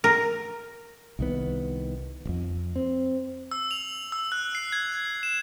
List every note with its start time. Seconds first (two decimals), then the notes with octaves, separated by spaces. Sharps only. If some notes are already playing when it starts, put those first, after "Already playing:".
0.04 A#4
1.19 C2 D#3 B3
2.25 D1 F2
2.76 C4
3.51 E6
3.71 F7
4.12 E6
4.32 F#6
4.55 C7
4.72 G#6
5.23 E7